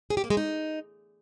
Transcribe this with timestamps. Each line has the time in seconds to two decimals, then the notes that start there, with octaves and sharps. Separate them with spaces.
0.10 G#4
0.17 G4
0.24 A#3
0.30 G#3
0.37 D#4